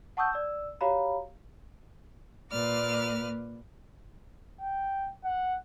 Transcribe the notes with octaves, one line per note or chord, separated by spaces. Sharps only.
F#5 A5 C#6 D#6 E6 G6
D5 E6
F#4 G4 C#5 F5 A#5 B5
A#2 A#3 B4 D5 F6
G5
F#5